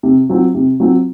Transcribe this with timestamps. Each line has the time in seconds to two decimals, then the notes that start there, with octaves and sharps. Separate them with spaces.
0.03 C3
0.29 F#3 C4 F4
0.55 C3
0.80 F#3 C4 F4